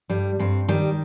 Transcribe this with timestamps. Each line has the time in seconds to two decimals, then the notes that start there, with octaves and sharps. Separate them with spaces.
0.10 G2 G3
0.39 G2 C4
0.68 D#3 G3